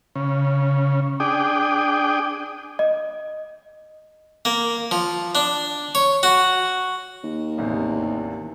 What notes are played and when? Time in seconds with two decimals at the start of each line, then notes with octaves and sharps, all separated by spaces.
0.15 C#3
1.20 D4 G#4 G5 D6 D#6
2.79 D#5
4.45 A#3
4.91 F3
5.35 D4
5.95 C#5
6.23 F#4
7.23 D#2
7.58 A1 E2 C3